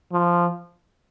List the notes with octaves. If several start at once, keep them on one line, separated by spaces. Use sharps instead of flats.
F3